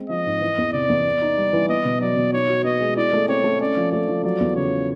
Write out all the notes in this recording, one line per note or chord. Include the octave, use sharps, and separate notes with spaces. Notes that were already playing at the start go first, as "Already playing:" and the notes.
Already playing: G#3 C4
F3 D#5
G#2
E3
E2
C3 D5
E2
B3
D#4
G3
E3
B3 D#5
B2
F#3 D5
B2
D#4 C#5
F#4
B3 D#5
G#3
E4 D5
A3
C4 C#5
A3
C#4 D5
F3
A3 D5
F3
F#3 D5
E2
C#3 C#5